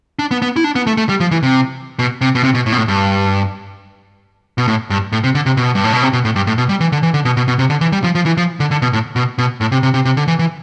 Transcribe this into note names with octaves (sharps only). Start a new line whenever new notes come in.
D4
B3
B3
E4
D4
B3
A3
A3
G3
F3
E3
C3
B2
C3
B2
C3
B2
A2
B2
A2
G2
B2
A2
G2
A2
C3
D3
C3
B2
G2
A2
B2
C3
B2
A2
G2
A2
B2
G3
E3
D3
E3
D3
B2
B2
B2
C3
D3
E3
G3
F3
F3
E3
F3
D3
D3
B2
A2
B2
B2
A2
C3
C3
C3
C3
D3
E3
E3